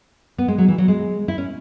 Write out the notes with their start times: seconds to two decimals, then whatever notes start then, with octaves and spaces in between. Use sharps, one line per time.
0.38 B3
0.48 G#3
0.58 F#3
0.68 E3
0.78 F#3
0.88 G#3
1.28 E4
1.38 C#4